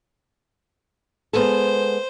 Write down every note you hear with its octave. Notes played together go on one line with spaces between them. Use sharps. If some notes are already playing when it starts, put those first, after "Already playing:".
G#3 B3 A4 C5